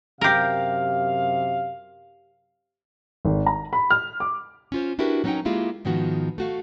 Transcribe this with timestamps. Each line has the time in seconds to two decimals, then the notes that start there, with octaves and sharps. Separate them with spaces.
0.21 F#2 C3 G4 A#4 F5
3.25 G#1
3.46 A#5
3.73 B5
3.90 F6
4.20 D6
4.72 C#4 F4 C5
4.99 D4 E4 F#4 G4 A#4 B4
5.24 F#3 B3 C#4 D#4 F#5 G5
5.45 G#3 A#3 E4 F4 G4 G#4
5.85 G#2 D#3 F3 B3 F#4
6.38 A3 F#4 F5